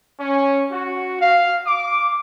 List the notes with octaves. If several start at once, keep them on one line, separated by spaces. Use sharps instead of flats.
C#4
F#4
F5
D6